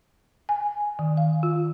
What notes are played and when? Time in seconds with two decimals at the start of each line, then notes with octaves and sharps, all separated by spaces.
0.49 G#5
0.99 D#3
1.17 F5
1.43 F4